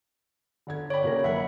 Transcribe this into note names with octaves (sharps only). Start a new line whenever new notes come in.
G1 D3 G#6
C#5 D5 G5 B5
A#2 C#3 A#4
F#1 A#3 E5 F#5 B5